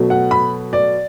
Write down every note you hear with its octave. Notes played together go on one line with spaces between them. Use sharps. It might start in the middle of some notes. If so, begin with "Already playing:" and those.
Already playing: B2 F#3 A3
F#5
B5
D5